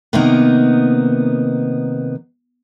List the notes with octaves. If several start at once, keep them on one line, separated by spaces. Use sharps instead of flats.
C3 D#3 A#3 B3 D4 D#4